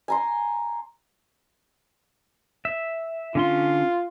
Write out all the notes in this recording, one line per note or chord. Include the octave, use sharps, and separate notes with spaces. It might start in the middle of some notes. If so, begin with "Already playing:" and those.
G#5 A#5 C6
E5
D3 C#4 F4 C6